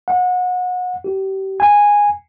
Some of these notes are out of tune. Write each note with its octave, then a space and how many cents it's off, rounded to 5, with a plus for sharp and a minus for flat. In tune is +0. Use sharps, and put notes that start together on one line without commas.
F#5 -30
G4 -30
G#5 -10